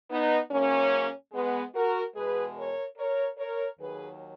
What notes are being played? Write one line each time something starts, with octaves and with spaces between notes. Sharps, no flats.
B3 D#4
G#2 F#3 A#3 C#4
G#3 B3
F#4 A#4
E2 B2 G#3 G#4 B4
A#4 C#5
A#4 C#5
A#4 C#5
D#2 D#3 F#3 G#4 B4